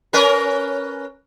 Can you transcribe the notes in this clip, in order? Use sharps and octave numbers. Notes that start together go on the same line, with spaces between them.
C#4 A#4 B4